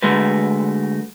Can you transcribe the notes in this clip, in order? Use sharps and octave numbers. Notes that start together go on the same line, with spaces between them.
D3 G#3 A3 F#4 B4